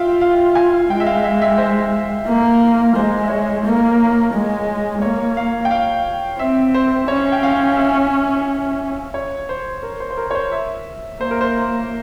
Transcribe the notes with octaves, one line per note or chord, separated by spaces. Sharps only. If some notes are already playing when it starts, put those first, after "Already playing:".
Already playing: F4 E5 F5 G5
F5
G#5
G#3 G5
E5
F5
E5
E5
C5
A#3
G#3 C5
E5
C#5
A#3
G#3
A#3 C#5
F5
G5
F5
C4 E5
C5
C#4 C#5
G5
F5
E5
C#5
C5
A#4
C5
C5
A#4
C#5
C5
E5
A#3 C5
A#4
C5